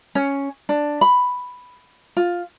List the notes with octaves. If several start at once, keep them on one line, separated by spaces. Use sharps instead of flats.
C#4
D4
B5
F4